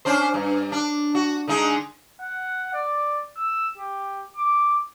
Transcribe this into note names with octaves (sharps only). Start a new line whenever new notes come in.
C#4 D4 C5
G2
D4
F#4
D3 G#3 D#4
F#5
D5
E6
G4
D6